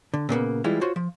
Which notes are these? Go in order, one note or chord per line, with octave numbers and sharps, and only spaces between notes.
D3
A#2 C#3 A#3 B3
E3 G3 G#3 E4 F4
F4 F#4 C5 C#5
F3